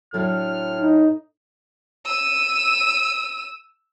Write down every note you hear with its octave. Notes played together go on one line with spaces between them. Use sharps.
A2 F#3 D4 F6
D#4
E6 D#7